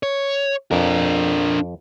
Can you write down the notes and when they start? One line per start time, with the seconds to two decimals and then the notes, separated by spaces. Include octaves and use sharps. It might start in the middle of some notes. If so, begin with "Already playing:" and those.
0.03 C#5
0.71 F2 D4 A#4